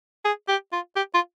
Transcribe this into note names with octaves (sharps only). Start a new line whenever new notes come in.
G#4
G4
F4
G4
F4